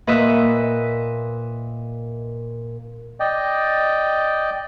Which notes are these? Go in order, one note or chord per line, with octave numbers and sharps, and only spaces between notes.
A#2 B4 D#5 E5
D5 D#5 G5